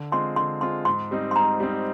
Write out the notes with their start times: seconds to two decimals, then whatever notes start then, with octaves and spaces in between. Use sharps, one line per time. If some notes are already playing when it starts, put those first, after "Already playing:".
Already playing: D3
0.12 G#3 C4 F4 C6
0.36 D3 C6
0.61 G#3 C4 F4 C6
0.85 G#2 C6
1.11 G3 C4 D#4
1.31 C6
1.36 G#2 A#5
1.60 G3 C4 D#4